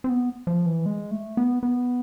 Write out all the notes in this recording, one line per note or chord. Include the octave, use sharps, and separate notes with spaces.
C4
B3
F3
E3
G#3
A3
B3
B3